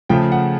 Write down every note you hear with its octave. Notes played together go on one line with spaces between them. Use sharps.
C#3 F3 A3 G5
F#5